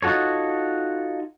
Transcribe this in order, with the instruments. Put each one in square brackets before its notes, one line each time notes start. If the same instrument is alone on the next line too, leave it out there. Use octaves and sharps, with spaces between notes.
[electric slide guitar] D#4 F4 F#4 A4 C#5